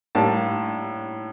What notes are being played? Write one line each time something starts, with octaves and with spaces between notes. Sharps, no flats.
A2 G3 A#3 A5